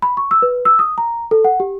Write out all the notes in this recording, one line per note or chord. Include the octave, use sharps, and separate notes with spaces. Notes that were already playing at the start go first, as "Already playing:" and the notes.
B5
C#6
E6
B4
E6
D#6
A#5
A4
F#5
G4